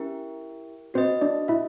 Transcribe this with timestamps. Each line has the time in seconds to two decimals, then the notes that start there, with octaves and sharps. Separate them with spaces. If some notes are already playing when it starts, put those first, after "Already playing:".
Already playing: C#4 E4 G4 A#4
0.94 C4 F#4 B4 C5 D#5
1.21 D4 D5
1.48 E4 E5